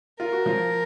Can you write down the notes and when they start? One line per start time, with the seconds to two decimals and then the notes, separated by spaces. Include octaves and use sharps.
0.20 F4 A#4
0.33 F#4
0.46 F3 F4